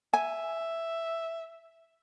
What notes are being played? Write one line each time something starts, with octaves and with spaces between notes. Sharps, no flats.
E5 G#5